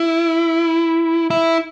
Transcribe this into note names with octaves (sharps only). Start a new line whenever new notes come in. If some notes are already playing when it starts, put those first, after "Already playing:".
Already playing: E4
E4